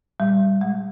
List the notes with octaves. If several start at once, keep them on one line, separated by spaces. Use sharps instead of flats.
A#2 G3
A#2 G#3